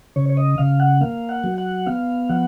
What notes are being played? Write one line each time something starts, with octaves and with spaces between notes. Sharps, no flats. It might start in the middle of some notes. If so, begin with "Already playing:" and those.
C#3 C#5
C#5
D#5
C#3 F5
F#5
A#3 F5
F#5
F#3
F#5
B3 F5
F3 F#5